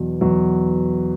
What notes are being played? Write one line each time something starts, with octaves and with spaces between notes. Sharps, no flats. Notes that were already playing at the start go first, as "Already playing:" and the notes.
Already playing: E2 B2 F#3
E2 B2 F#3